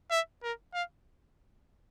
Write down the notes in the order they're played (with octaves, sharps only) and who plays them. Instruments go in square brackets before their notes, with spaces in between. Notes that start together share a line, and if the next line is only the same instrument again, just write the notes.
[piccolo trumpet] E5
A#4
F5